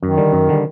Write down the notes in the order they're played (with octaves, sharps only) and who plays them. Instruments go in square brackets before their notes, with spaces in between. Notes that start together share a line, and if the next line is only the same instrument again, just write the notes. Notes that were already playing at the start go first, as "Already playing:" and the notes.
[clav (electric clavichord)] F#2 [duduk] D#3
[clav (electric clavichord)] D3 G3
F#2
D3 G3